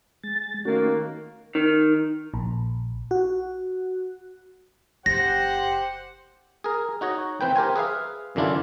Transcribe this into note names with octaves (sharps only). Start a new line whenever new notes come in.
G#3 A6
D#3 A3 A#3 C#4 F#4
D#3
A#1
F#4
F#1 G4 C5 F#5 A#6
G#4 A#4
D#4 F#4 C#5 D#5
E3 C4 B4 G5
G4 A#4 C5 G#5
G#4 B4 E5 F5
F#2 D3 E3 D4 E4 F4